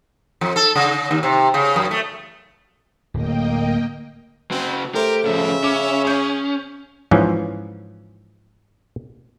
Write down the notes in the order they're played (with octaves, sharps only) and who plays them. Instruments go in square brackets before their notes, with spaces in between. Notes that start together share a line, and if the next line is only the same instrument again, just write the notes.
[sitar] F2
A4
C#3
D#2
C3
C#3
F#2
A3
[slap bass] D1 [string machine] A#3 D#5 G5
[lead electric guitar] C#3 F#4 [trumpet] C4
[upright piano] A3 C5 [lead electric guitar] G4 [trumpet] A#4
[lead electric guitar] A2 F3 [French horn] C#3 [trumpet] E5
[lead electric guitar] C#4 [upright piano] D6
[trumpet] G#4 [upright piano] C#6 G6
[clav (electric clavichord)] G#2 E3 F3 C#4